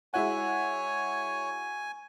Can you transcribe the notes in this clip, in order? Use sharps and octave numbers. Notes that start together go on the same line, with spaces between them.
G#3 E4 F#4 C#5 E5 F#5 G#5